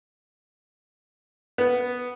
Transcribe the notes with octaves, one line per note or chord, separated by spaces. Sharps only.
B3